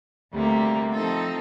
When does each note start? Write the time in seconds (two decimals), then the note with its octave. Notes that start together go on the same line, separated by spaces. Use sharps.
0.32 D2 C3 G3 A#3
0.92 F3 C4 D#4 A4